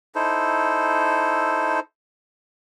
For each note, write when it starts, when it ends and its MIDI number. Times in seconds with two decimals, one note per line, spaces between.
0.15 1.80 63
0.15 1.80 64
0.15 1.80 69
0.15 1.80 72